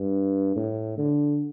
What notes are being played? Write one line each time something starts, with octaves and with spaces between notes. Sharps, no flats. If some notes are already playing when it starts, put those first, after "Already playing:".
Already playing: G2
A2
D3